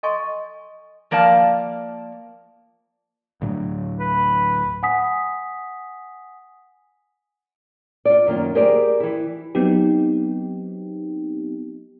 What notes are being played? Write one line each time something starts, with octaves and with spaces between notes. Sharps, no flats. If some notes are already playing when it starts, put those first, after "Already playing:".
A4 D#5 G#5 C6 C#6
F3 A#3 D5 F5 A5
D2 A2 F#3
B4
F#5 G#5 D#6 B6
F4 D5
F#2 D#3 A#3 F4
G4 G#4 A#4 C5 D5
E3 E4
F#3 B3 C4 D#4 G4